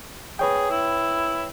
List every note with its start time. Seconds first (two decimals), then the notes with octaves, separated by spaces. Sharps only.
0.39 G#4 B4 C#5 G5
0.70 E4